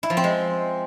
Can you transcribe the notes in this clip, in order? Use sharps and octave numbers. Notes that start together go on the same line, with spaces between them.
E4
F3
C4
G#3